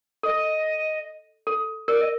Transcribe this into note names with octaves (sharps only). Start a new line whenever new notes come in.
A4 D#5
A4
A#4 D5
D#5